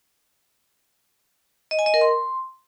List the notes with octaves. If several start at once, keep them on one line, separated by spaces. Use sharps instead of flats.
D#5
G#5
D#5
A#4
C6